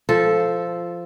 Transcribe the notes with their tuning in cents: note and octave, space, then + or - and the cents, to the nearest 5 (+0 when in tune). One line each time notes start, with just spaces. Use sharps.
F3 -10 A4 +0